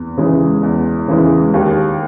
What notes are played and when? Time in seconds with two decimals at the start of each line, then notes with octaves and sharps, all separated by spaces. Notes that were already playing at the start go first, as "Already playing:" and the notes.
Already playing: E2
0.18 C#3 E3 G#3
0.63 E2
1.08 C#3 E3 G#3
1.54 D#2